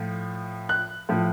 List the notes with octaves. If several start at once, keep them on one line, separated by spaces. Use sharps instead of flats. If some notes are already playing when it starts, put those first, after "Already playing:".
Already playing: A2 F3
F#6
A2 F3